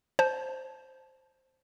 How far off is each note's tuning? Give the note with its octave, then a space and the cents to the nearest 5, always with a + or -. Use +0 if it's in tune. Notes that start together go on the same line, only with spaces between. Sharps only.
C5 +0 A5 -15